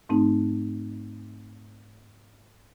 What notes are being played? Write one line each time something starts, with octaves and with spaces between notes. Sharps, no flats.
G#2 A3 C4 D#4